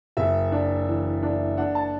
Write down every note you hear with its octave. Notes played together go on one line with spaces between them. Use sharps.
F#1 E5
D4
E3
D4
D4 F#5
A5